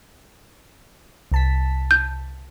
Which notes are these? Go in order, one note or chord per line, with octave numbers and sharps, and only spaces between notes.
C2 A5 B6
G6